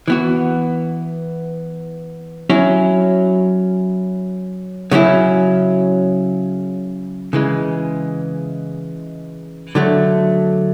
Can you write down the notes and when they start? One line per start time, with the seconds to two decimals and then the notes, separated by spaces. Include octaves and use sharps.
0.08 E3 B3 F#4
2.50 F#3 C#4 E4
4.91 C#3 F#3 C#4 E4
7.33 C#3 E3 G#3
9.75 D3 F#3 A3